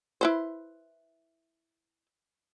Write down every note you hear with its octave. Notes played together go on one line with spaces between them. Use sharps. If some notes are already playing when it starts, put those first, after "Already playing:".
E4 B4 C5